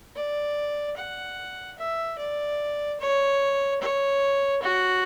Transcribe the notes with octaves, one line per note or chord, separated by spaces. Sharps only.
D5
F#5
E5
D5
C#5
C#5
F#4